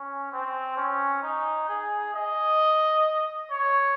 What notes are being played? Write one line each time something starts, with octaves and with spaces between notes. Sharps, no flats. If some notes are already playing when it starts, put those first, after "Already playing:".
Already playing: C#4
C4
C#4
D#4
G#4
D#5
C#5